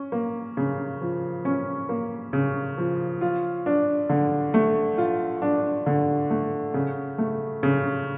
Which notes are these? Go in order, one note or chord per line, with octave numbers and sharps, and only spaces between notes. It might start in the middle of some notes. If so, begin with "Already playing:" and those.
Already playing: C#4
A#3
C#3
F3
C#4
A#3
C#3
F3
F4
D4
D3
A3
F4
D4
D3
A3
C#3
A3
C#3